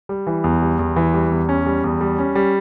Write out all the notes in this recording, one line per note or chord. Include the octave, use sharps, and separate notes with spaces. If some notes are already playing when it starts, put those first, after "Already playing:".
G3
E3
E2
G3
E2
E3
G3
E2
C#4
G3
E2
G3
C#4
G3